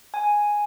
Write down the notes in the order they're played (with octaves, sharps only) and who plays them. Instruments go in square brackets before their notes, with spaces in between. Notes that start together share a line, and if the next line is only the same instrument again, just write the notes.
[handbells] G#5